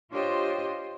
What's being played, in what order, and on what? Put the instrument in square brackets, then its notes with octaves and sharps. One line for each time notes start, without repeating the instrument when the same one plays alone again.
[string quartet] D4 F4 G4 C5 C#5 D#5